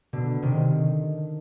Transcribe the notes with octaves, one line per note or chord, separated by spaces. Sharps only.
B2 D3
C3 D#3